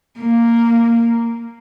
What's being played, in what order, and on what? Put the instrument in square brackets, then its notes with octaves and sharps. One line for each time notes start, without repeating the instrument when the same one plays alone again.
[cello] A#3